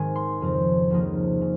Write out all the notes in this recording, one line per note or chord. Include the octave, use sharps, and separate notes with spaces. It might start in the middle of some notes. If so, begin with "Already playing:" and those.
Already playing: G#2 D#3 G#3 C4 G#5
C6
F2 C#3 F3 C4
C#2 C#3 F3 A#3 D#4
C#3